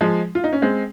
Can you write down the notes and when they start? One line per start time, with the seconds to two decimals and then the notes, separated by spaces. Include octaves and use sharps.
0.01 F3 G#3
0.35 F4
0.44 D#4
0.53 C#4
0.62 G#3 C4